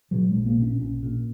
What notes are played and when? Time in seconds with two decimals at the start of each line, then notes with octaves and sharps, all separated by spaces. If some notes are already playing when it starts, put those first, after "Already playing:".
0.11 A#2 F#3
0.29 G#3
0.34 A#1
0.46 A#3
0.57 A#2
0.62 C#4
0.79 A#1 C#4
1.02 A#2